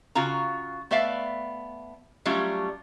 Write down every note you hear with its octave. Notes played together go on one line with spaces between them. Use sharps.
C#3 F4 F#4 A#5
A3 B3 D5 E5 F5
F#3 G3 A3 C#4 F4